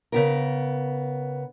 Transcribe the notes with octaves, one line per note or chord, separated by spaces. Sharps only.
C#3 B3 A#4